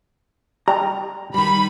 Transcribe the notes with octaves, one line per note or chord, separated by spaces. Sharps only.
G3 A#5
D#3 G3 B5